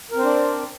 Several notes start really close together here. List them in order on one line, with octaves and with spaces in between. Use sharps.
A#4 C4 C5 D4 D5